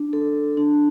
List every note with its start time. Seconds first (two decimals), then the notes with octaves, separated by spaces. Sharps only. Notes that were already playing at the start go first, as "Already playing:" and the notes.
Already playing: D4
0.13 A4
0.57 D4